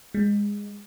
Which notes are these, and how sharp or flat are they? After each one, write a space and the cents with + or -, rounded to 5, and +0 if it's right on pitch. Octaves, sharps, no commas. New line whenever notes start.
G#3 -15